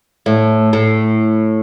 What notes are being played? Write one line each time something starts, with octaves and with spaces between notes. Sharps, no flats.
A2
A2